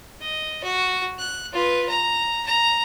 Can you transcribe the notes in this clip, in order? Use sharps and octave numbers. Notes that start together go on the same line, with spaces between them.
D#5
F#4
F#6
F4 B4
A#5
A#5